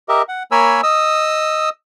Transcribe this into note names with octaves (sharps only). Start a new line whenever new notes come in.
G4 A#4 D#5 E5
F#5
A#3 A#4 C#5 G#5 B5 E6
D#5 D#6 E6